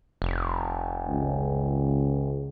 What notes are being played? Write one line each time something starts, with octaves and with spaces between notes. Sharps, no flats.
F1
C#2